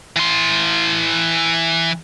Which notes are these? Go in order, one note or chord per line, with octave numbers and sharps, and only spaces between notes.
E3 C6